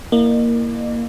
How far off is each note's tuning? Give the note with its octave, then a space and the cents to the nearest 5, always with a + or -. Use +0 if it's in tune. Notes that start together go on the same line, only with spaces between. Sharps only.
A#3 +0 E4 +0 D#5 -45